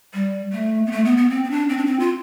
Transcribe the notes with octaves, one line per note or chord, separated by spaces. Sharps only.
G3
A3
B3
A3
B3
B3
C4
C4
D4
C4
D4
C4
F4